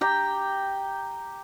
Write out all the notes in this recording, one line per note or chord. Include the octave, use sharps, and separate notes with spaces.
G4 G5 A#5